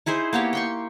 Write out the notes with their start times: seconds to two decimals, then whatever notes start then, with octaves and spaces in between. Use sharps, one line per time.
0.06 D#4 E4 G#4 C5
0.33 A#3 B3 G4 C#5
0.53 G5 C6 C#6